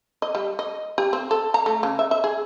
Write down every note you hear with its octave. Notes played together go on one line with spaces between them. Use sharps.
D#5
G3
D#5
G4
C4
A4
A#5
A3
C#3
E5
E5
G#4